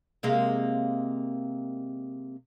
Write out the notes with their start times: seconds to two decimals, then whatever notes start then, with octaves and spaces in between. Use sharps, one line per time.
0.23 C3 G#3 A#3